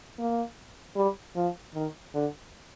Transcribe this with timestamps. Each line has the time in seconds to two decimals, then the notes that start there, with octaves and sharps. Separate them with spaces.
0.18 A#3
0.96 G3
1.35 F3
1.74 D#3
2.14 D3